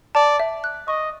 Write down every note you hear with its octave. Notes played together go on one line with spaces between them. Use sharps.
D5 A5
E5
F#6
D#5 C#6